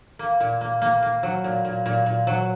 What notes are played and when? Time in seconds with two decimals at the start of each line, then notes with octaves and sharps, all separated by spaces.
0.19 A#3
0.40 A#2
0.61 A#3
0.82 A#3
1.02 A#3
1.23 F#3
1.44 A#2
1.65 A#2
1.86 A#2
2.06 A#2
2.27 F#3